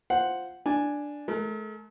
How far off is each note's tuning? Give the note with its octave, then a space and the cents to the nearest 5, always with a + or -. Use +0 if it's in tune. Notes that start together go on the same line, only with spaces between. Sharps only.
F4 +0 C5 +0 F#5 +0
D4 +0 G#5 +0
A3 -45 A#4 -30